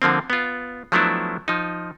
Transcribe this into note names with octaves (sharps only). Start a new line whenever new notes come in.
D3 F3 A#3 C4
B3 F4
F3 F#3 A3 B3 D4 E4
F3 D#4